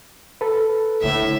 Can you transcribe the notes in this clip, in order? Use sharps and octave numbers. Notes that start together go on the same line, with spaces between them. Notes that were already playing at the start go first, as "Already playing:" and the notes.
A4 B4
A2 D3 A#3 E5